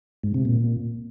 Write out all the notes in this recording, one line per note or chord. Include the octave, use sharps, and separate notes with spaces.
G#2
C3
A#2